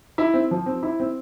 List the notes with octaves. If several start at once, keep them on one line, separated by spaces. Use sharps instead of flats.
E4
C4
F3
C4
E4
C4